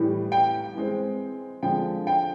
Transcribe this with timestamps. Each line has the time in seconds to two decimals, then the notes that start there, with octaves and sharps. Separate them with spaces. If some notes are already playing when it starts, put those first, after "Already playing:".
Already playing: A2 E3 G3
0.32 G5
0.75 E3 G#3 C4
1.63 D3 F3 G#3 G5
2.07 G5